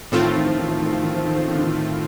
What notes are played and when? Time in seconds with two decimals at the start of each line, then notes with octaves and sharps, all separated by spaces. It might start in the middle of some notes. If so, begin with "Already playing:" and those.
0.12 A2 D#3 A3 C4 F4
0.23 F3
0.35 D#3
0.46 F3
0.58 D#3
0.68 F3
0.80 D#3
0.92 F3
1.03 D#3
1.14 F3
1.25 D#3
1.36 F3
1.48 D#3
1.56 D3
1.61 D#3